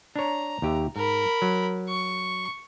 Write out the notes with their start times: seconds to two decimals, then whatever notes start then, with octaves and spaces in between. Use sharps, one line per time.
0.16 D4 C#5 A#5
0.62 D#2 G4 E5
0.96 G#2 A#4 B5
1.42 F#3
1.88 C#6